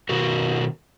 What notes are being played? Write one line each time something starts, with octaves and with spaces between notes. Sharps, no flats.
B2 D#3 F#4 A#4